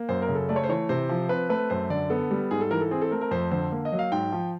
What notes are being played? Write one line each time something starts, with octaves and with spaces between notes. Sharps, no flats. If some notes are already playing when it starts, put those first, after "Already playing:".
Already playing: A#3
F#2 C5
A#4
C#3
A4
A3 D5
C#5
C5
E3 C#5
C3 C5
F3
C4 B4
A3 B4
F#2 C5
D3 D5
B3 A4
G3
G#2 G#4
A4
E3 A#4
A4
C4 G#4
A4
A3 A#4
A#4
F2 C5
D3 C5
A#3
D#5
F#3
F5
G#2 G5
F3